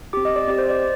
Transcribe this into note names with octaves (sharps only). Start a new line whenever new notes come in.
C4 G4 D6
D#5
D5
C4 G4 D5
C5
D5